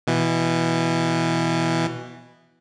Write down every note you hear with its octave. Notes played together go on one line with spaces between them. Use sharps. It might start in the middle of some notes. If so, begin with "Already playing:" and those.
B2 E3